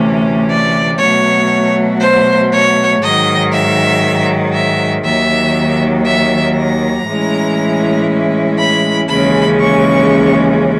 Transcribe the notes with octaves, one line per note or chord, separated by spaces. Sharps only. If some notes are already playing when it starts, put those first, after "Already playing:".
Already playing: D2 C3 E3 A3 C#4
D5
B2 F#3 A3 C#5
C5
C#5
G#2 D#3 F#3 D#5
E5
E5
D#2 D#3 F#3 E5
E5
A#5
A2 E3 G#3 C#4 E4
B5
D#2 C#3 E3 G#3 C#4 B5
C#6